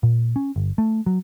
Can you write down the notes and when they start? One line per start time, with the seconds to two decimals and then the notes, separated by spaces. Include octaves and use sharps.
0.03 A#2
0.36 C#4
0.56 G1
0.78 A3
1.06 F#3